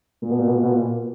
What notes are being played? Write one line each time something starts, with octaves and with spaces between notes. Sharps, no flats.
A#2
B2
A#2
B2
A#2
B2
A#2